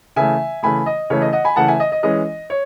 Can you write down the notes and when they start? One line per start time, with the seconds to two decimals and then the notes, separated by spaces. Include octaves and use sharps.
0.16 C#3 E3 A3 E5 G#5
0.63 C#3 E3 A3 G#5 B5
0.86 D#5
1.10 C#3 E3 A3 C#5
1.22 D#5
1.33 D#5 F#5
1.45 G#5 B5
1.56 C#3 E3 A3 F#5 A5
1.68 E5 G#5
1.80 D#5
1.92 D#5
2.03 E3 G#3 C#4 D#5
2.50 C#5